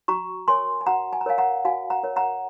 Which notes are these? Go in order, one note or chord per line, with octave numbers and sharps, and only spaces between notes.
F#4 A#5 C#6
A#4 C#5 G#5 C6
G#5
F#4 F#5 A#5
G#5
A#5
A#4 C#5 F5 G#5
F#5 A#5
F#4 F5 G#5
F#5 A#5
A#4 C#5
F#5 A#5